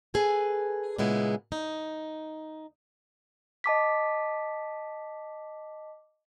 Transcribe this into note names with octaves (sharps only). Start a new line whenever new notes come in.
G#4 A4 B4 G#5
A#2 C#3 G#3 B3 E4
D#4
D#5 A5 D6 B6